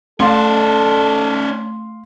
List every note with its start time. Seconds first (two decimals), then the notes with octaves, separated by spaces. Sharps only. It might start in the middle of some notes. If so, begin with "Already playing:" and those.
0.20 A3 C#4 A4 D5 F5 C6